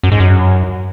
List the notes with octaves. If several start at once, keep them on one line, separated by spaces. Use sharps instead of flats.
F#2
G#2
F#2